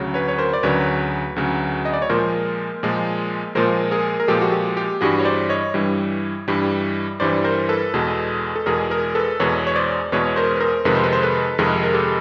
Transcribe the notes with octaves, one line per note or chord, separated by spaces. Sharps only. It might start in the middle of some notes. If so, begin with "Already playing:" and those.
Already playing: D2 C#3 F#3
B4 C#5
C#5
A#4 C5
D5
D2 C#3 F#3 B4 C#5
D2 C#3 F#3
D#5
D5
C#5
A#2 F3 G#3 A#4 C5
A#2 F3 G#3
A#2 F3 G#3 A#4 C5
G#4 A#4
A#4
A#2 F3 G#3 G4 A4
F#4
G4
G4
G2 E3 G3 F#4 G#4
C#5
C5 D5
C#5 D#5
G2 E3 G3
G2 E3 G3
G2 E3 G3 C5 D5
A#4 C5
A4 B4
E2 B2 G#3
A4
E2 B2 G#3 G#4 A#4
G#4 A#4
A4 B4
E2 B2 G#3 B4 C#5
C#5
C5 D5
E2 B2 G#3 B4 C#5
C#5
A#4 C5
B4
A#4 C5
F2 C3 D#3 G#3 B4
C5
B4
C5
A4 B4
F2 C3 D#3 G#3 G#4 A#4
A#4
G4 A4